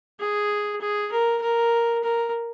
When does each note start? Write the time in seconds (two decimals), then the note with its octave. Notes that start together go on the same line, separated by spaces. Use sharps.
0.20 G#4
0.80 G#4
1.12 A#4
1.42 A#4
2.03 A#4